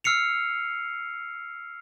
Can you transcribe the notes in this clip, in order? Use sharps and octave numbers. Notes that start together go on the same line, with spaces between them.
E6 F6 C7 C#7 F7